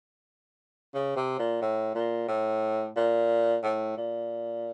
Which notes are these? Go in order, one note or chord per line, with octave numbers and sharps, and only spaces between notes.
C#3
C3
A#2
A2
A#2
A2
A#2
A2
A#2